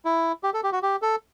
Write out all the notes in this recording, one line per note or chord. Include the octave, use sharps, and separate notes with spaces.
E4
G4
A4
G4
F#4
G4
A4